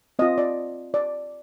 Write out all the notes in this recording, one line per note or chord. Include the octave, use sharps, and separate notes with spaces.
C4 F4 D#5
D5
D5